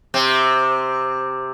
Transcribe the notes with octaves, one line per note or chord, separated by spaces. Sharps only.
C3 C4